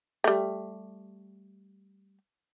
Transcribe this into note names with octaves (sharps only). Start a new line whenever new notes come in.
G3 A3